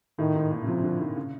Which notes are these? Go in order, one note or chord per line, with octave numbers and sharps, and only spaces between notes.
A2 D#3
G#2
A#2
C#3
C3 F3
D3
D#3
C#3